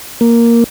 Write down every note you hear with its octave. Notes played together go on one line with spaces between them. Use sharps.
A#3